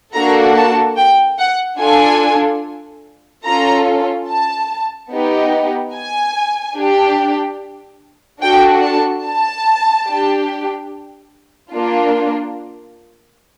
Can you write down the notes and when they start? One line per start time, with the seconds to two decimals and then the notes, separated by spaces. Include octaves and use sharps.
0.14 A#3 D4 F#4 A4 A#5
0.56 A5
0.97 G5
1.39 F#5
1.80 D4 F4 A4 G#5
3.45 C#4 F4 A4 A#5
4.28 A5
5.12 B3 D#4 G4
5.94 G#5
6.76 D4 G4
8.42 D4 F#4 A4 G5
8.83 A5
9.25 A5
10.08 D4 G4
11.72 A#3 D4 F4